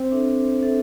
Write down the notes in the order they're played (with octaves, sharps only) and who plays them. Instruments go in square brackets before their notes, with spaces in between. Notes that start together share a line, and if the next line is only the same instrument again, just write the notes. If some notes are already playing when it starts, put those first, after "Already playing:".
Already playing: [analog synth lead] C4
[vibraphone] D4 A4 E5
D4 A4 E5